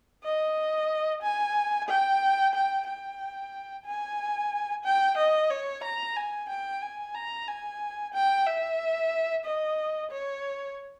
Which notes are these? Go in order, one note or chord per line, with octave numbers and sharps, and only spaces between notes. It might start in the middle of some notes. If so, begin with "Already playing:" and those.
D#5
G#5
G5
G5
G5
G#5
G5
D#5
C#5
A#5
G#5
G5
G#5
A#5
G#5
G5
E5
D#5
C#5